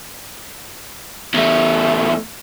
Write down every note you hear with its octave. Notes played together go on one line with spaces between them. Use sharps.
E2 A3